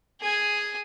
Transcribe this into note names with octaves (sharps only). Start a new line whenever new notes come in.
G#4 G#5